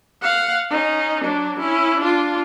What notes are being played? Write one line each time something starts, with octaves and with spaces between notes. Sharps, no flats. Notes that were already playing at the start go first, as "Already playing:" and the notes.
F5 F#5
C#4 D#4
F#3 D4
C#4 E4
D4 F4